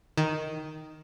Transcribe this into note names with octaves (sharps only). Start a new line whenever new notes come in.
D#3